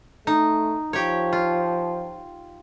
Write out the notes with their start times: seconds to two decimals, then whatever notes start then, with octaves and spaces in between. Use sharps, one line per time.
0.27 A3 D#4
0.93 F3 G4 C#5
1.33 F4